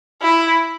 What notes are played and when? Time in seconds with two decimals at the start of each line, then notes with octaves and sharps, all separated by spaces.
0.22 E4